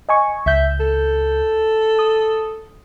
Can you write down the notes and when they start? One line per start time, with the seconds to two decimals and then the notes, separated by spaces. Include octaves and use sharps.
0.09 D#5 G#5 C#6
0.46 C#2 E5 G6
0.80 A4
1.99 D#6